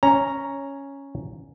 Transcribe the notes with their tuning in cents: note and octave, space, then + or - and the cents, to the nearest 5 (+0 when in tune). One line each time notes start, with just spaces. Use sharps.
C#4 +0 A#5 +0